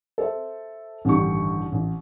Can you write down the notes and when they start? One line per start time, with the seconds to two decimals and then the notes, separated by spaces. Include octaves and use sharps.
0.18 A4 C5 E5
1.05 A1 G2 D3 D#3 G4 C#6
1.72 A1